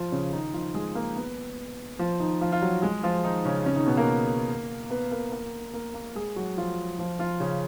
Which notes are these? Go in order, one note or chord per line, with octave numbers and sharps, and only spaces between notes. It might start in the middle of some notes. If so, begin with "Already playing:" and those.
Already playing: F3 F4
C#3 C#4
D#3 D#4
F3 F4
G#3 G#4
A#3 A#4
B3 B4
F3 F4
D#3 D#4
F3 F4
F4
F#3 F#4
G#3 G#4
F3 F4
D#3 D#4
C#3 C#4
C#3 C#4
D#3 D#4
B2 B3
A#3 A#4
B3 B4
A#3 A#4
A#3 A#4
A#3 A#4
A#3 A#4
G#3 G#4
F#3 F#4
F3 F4
F3 F4
F3 F4
C#3 C#4